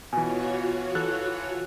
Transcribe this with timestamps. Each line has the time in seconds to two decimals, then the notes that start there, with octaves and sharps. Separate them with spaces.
0.13 B2 E3 F4 F#4 C#5 G#5
0.95 E3 A4 F#6